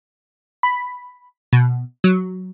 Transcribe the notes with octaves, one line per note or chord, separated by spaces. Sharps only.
B5
B2
F#3